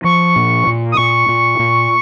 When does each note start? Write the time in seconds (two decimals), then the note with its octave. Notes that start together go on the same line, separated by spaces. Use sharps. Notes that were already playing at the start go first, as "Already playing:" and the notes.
0.04 F3 C#6
0.36 A#2
0.67 A#2
0.92 D#6
0.97 A#2 C#6
1.28 A#2
1.59 A#2